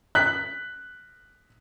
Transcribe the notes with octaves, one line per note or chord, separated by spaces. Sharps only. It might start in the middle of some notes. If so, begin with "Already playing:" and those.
F#6 B6